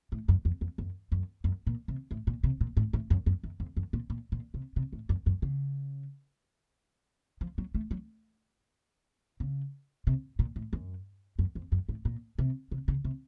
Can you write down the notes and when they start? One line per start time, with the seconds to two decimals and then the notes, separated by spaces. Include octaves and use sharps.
0.12 A2
0.28 F#2
0.45 F2
0.61 F2
0.78 F#2
1.12 F#2
1.44 F#2
1.67 A#2
1.88 C3
2.11 A2
2.27 A#2
2.43 C3
2.61 A#2
2.77 A2
2.93 A2
3.10 F#2
3.26 F#2
3.43 F#2
3.60 F2
3.77 F#2
3.93 A#2
4.10 A#2
4.32 A#2
4.54 C3
4.76 C3
4.93 A2
5.09 F#2
5.26 F#2
5.42 C#3
7.41 F3
7.58 F#3
7.75 A3
7.91 F#3
9.40 C#3
10.07 C3
10.39 A#2
10.56 A2
10.73 F#2
11.39 F#2
11.55 F2
11.72 F#2
11.89 A2
12.05 A#2
12.38 C3
12.71 C3
12.88 C#3
13.04 C3